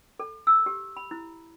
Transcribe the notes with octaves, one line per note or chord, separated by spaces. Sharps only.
A4
E6
G4
B5
E4